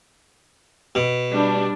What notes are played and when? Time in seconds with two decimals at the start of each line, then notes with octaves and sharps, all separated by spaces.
0.95 B2
1.31 G3 D4